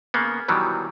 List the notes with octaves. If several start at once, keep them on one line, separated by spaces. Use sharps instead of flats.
C#3 A#3 B3
B2 D#3 E3 F#3 G3